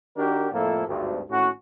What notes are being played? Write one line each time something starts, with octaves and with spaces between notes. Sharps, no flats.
D#3 D4 F#4 G4 A#4
F2 A2 F3 A#3 E4 A4
G#1 D2 G2
G#1 A2 C#4 F#4